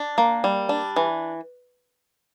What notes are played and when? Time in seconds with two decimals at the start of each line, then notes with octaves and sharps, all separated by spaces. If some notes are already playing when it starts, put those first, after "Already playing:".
Already playing: D4
0.18 A#3
0.44 G3
0.69 D4
0.96 E3